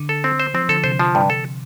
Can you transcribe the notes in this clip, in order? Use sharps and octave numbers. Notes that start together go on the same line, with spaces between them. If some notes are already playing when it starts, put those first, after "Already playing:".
Already playing: D3
A4
C4
C5
F3 C4
D3 A4
C3 C5
F3
G2
A4